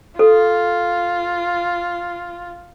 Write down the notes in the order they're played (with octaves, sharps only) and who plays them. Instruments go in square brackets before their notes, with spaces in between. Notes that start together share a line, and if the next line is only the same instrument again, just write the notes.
[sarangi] F4 [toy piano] A4